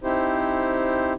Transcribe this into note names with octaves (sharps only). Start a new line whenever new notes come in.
C4 D#4 E4 G4 C5